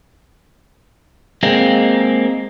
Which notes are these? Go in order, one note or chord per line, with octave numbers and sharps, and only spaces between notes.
G#3 A#3 C4